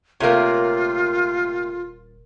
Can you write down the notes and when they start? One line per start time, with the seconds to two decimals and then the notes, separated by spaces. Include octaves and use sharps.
0.20 D#1 C3 A3 A#3 F4 A#4 C#5